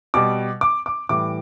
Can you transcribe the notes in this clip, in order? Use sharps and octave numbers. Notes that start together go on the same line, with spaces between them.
B2 G3 D6
D6
D6
A2 E3 G3 D6